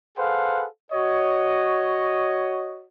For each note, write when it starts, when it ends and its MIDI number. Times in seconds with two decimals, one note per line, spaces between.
0.18 0.66 68
0.18 0.66 69
0.18 0.66 71
0.18 0.66 72
0.18 0.66 77
0.18 0.66 78
0.93 2.84 66
0.93 2.84 73
0.93 2.84 75